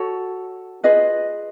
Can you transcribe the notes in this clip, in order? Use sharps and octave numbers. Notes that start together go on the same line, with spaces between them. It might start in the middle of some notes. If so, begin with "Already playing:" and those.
Already playing: F#4 A4 C#5
F4 G#4 B4 D#5